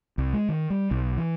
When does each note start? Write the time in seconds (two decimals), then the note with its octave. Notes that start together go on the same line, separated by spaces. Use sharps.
0.18 C2
0.33 G#3
0.49 D#3
0.70 G3
0.91 B1
1.17 E3